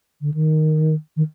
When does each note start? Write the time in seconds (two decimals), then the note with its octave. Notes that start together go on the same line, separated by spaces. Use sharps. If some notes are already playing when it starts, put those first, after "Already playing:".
0.21 D3
0.34 D#3
1.16 D#3